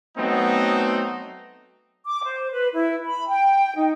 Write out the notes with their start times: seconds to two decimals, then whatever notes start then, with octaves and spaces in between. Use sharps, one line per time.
0.17 F#3 A3 B3 C4 D#4
2.06 D6
2.24 C5
2.52 B4
2.74 E4
3.05 B5
3.28 G5
3.76 D#4